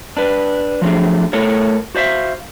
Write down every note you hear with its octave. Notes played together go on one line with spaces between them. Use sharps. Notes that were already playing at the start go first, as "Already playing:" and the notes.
D4 B4
F3 F#3 A3 D4 G#4
A3 A4 A#4 C#5
F#4 C5 D5 E5 F5